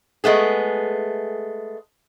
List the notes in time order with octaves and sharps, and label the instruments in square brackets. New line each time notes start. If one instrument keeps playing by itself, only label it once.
[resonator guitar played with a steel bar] G#3 A3 B3 G#4